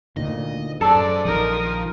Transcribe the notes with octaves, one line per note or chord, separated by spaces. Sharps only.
D2 A#2 D#3 D#5
F#2 G#4 A4 C5 D5
A#1 D#3 F3 A#4 D#6